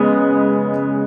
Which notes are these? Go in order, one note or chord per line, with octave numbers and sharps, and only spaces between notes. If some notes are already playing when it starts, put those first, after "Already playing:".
Already playing: C#3 G#3 B3